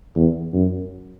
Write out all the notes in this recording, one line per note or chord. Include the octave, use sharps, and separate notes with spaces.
E2
F#2